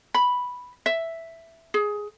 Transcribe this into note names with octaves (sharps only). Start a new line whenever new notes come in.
B5
E5
G#4